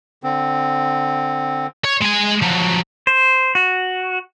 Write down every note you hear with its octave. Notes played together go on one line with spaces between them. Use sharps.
D3 C4
C#5
G#3 G#5
F3 F#3
C5
F#4